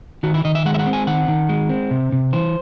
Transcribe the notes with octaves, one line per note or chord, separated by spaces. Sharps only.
D#3 F#4
E4
D#3 D#5
E5
G#3 F#5
E5
F#5
C4
G#5
D#3 F#5
D#3
G#3
C4
C3
C3
E3 C5